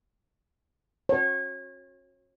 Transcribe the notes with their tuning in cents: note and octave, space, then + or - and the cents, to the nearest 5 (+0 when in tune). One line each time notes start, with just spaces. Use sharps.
C#5 -30